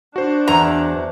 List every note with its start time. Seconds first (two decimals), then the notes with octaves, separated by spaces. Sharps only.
0.16 D4 F#4 C5
0.48 E2 A#5